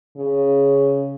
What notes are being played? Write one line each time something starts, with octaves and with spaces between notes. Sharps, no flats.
C#3